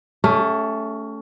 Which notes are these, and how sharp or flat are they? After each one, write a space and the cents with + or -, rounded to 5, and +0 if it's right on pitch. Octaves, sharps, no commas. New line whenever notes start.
A3 +0 C#4 +20 G4 +45